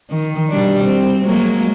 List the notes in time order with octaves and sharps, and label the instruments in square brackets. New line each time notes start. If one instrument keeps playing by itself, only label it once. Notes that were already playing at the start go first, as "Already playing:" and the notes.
[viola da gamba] D#3
B2 G3 D4
C4
F#3 G#3 A#3